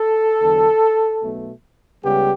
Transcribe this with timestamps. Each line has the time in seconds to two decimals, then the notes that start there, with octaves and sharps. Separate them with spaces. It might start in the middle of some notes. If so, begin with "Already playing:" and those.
Already playing: A4
0.41 E2 D3 F#3
1.22 B1 B2 A3
2.04 C#2 C#3 G3 B3 G4